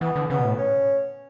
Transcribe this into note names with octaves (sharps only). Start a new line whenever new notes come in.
E3 B3
D3
C#3 B3
B2
A2
C#4